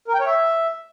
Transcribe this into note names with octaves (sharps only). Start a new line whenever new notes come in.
A#4
G5
C#5
E5